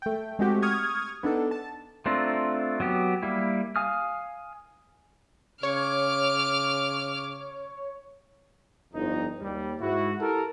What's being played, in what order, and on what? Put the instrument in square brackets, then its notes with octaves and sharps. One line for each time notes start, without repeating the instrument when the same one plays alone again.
[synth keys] A3 G5
G#3 A3 C4 F#4 G4
C#6 D#6 F6 G#6
B3 D4 D#4 A4
A5
[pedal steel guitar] A3 C4 D4 F4 A#4
F#3 B3 G4
G3 A#3 E4
F5 G#5 D#6 F6
[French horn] C#3 [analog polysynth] C#5 [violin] D6 F6
[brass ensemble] G1 F2 D#4
D#2 G3
G#2 E4 F#4
E4 G4 A4 A#4